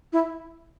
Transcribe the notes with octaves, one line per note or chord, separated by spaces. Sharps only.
E4